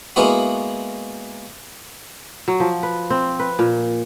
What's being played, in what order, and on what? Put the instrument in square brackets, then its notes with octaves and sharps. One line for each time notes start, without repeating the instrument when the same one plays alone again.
[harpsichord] G#3 A#3 B3 E4 F#4
[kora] F#3
F3
B4
C4
B4
A#2